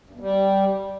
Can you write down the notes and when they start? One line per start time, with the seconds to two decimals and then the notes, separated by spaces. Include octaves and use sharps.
0.09 G2
0.15 B2
0.20 G3